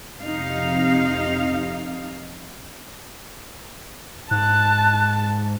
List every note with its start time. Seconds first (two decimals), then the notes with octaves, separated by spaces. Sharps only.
0.22 F2 C3 D#4 F5
4.31 G#2 A5 F#6